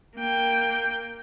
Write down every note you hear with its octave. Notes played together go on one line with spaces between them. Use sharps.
A#3 G5